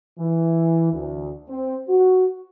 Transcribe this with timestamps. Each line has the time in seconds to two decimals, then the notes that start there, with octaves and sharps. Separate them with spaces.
0.19 E3
0.93 D2
1.49 C4
1.89 F#4